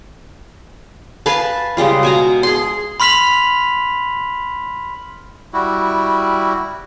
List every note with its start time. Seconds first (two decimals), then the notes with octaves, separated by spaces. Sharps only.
1.26 B4 F5 G#5 A5
1.77 C#3 G3 G#3 F4
2.03 B2 G#5 A#5
2.43 G#4 C6
3.00 B5 C6 F6 B6 F7 F#7
5.53 G3 E4 F#4